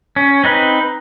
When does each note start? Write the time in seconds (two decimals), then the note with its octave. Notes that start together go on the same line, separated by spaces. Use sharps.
0.16 C#4
0.44 C4 D#4 B4